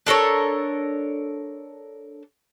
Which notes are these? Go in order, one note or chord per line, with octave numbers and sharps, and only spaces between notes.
D4 A4 A#4 C#5